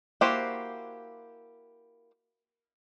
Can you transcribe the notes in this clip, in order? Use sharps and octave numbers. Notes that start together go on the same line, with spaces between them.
A#3 E4 F#4 G4 C5